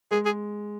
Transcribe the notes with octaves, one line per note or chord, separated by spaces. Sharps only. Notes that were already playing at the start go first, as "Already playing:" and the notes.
G#3 G#4
G#4